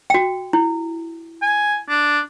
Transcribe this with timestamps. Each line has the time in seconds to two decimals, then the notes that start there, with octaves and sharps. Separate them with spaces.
0.10 F#4 G5
0.53 E4
1.42 G#5
1.89 D4